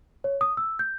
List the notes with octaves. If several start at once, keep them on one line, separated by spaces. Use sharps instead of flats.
C#5
D#6
E6
G6